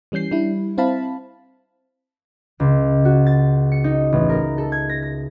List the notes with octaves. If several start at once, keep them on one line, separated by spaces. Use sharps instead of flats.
E3 G3 C#4 G6 C7
G3 D4 E4
C4 E4 C5 F5 A5 B5
C#2
F#4
A6
C#7
D#4
A1
A#4
A4
G#6
A#6
A#6